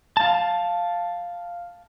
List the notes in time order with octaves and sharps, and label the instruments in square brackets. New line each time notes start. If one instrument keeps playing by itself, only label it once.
[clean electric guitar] F5 A5